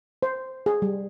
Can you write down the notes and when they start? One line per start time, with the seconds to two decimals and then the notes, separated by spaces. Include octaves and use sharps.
0.23 C5
0.66 G#4
0.82 G3